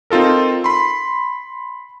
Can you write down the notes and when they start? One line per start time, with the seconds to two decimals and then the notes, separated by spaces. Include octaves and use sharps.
0.10 C4 D#4 F4 A4 A#4
0.64 B5 C6